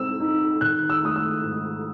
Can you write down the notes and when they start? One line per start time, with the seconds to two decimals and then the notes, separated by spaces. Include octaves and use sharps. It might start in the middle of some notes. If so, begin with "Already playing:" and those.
Already playing: C4 D#4 E6
0.20 D#4
0.61 D#3 F#6
0.90 E6
1.03 A3 D#6
1.16 E6
1.43 G#2